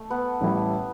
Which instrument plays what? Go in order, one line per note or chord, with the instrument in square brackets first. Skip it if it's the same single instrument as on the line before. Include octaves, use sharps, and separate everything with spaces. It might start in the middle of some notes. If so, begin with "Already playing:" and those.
Already playing: [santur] A3
B3
[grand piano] A1 A2 G3 E4 G4